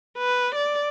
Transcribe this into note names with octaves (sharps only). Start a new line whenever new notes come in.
B4
D5